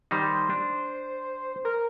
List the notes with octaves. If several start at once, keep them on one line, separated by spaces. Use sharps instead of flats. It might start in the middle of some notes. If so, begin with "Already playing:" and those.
D#3 G3 D#4 C5
D4
A#4